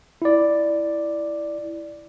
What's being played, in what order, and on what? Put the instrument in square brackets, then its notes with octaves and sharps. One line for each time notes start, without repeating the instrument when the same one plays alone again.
[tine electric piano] E4 D5